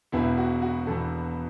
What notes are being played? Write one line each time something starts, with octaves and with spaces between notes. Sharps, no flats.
E1 E2 B2 E4
F#4
F#4
E1 E2 B2 A4